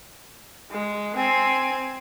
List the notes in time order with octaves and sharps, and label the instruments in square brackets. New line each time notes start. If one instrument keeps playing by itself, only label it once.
[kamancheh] G#3
C4 G#5